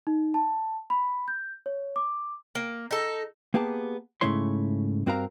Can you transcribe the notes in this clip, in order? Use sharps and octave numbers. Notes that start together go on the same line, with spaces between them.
D#4
A5
B5
G6
C#5
D6
A#3
D#4 A4
A#3 B3 G4 G#4 A5
G#2 C#3 A3 E4 C#5 C6
G2 C4 F#4 A#4 F5 A#5